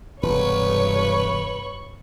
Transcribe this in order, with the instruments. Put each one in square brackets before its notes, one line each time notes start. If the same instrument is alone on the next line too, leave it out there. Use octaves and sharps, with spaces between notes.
[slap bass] E1 [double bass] G2 C3 [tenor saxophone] B4 [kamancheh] C#5 C#6